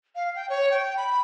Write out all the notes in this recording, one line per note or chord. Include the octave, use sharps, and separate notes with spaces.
F5
G5
C#5
G5
B5